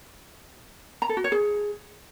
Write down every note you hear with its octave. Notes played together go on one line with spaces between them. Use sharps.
A#5
A4
F#4
C#5
G#4